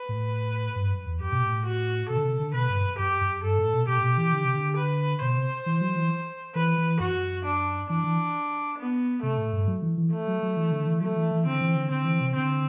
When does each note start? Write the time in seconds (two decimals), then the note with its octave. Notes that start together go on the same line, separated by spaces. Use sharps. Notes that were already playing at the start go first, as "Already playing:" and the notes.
Already playing: B4
0.09 A2
0.76 G2
0.91 F#2
1.06 E2
1.20 F#2 G4
1.32 B2
1.43 A2
1.65 F#4
2.09 B2 A4
2.17 D3
2.24 C3
2.39 D3
2.54 B2 B4
2.69 G2
2.84 F#2
2.98 F#2 G4
3.21 F#2
3.43 G2 A4
3.59 A2
3.73 B2
3.88 B2 G4
3.98 A2
4.03 B2
4.18 E3
4.33 D3
4.45 C3
4.55 D3
4.77 B4
5.21 B2 C5
5.37 C3
5.66 E3
5.81 F#3
5.96 E3
6.55 E3 B4
6.78 E3
7.00 F#2 F#4
7.45 D4
7.90 E3 D4
8.04 E3
8.79 B3
9.22 C3 A3
9.38 A2
9.53 G2
9.68 F#3
9.82 E3
9.97 E3
10.12 A3
10.27 F#3
10.42 F#3
10.57 E3
10.72 D3
10.87 E3
11.01 F#3 A3
11.16 E3
11.31 E3
11.46 D3 C4
11.61 E3
11.76 D3
11.91 D3 C4
12.05 E3
12.21 C3
12.35 D3 C4